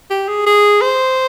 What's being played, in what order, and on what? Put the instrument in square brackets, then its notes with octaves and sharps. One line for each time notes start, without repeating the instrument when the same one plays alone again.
[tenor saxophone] G4
G#4
G#4
C5